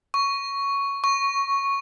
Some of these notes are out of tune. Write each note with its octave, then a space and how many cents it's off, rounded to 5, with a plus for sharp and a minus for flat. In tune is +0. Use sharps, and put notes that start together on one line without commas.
C#6 +5
C#6 -5